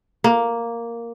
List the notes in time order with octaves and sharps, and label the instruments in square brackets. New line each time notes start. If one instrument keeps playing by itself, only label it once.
[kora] A#3